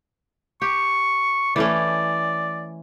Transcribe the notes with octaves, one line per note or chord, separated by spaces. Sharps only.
G4 C#6
E3 A3 C#4 D5